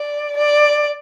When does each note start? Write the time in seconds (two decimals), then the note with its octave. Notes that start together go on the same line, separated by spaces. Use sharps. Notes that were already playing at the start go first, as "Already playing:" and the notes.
Already playing: D5
0.37 D5